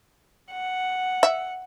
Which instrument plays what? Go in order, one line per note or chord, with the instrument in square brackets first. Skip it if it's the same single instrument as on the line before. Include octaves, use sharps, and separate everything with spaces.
[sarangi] F#5
[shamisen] E5